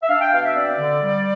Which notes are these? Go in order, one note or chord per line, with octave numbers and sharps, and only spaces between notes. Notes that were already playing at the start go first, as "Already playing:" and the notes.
E5
D4 F5
G5
B2 F5
E5
C4 D5
D3
G3